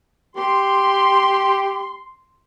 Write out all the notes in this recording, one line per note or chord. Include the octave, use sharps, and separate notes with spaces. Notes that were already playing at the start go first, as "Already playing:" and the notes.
G4 C6